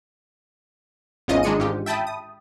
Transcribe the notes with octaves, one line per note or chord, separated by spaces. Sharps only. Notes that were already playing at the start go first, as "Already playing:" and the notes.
G#1 E2 G#2 C#4 F4 D#5
D#3 G#3 D4 G#4 C#7 D#7
A1 G#2 F4 G4
E5 G5 A5 B5 D#6
D#6